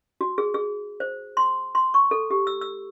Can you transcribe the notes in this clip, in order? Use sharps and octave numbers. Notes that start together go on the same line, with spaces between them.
F#4
G#4
G#4
C5
C6
C6
C#6
A4
G4
E6
E6